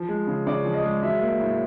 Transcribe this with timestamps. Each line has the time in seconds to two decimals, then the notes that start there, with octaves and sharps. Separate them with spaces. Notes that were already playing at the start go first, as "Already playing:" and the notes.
Already playing: F3
0.09 G#3
0.27 C#3
0.46 C#3 D5
0.65 F3
0.74 D#5
0.84 G#3
1.03 F#3 E5
1.21 A#3
1.40 A2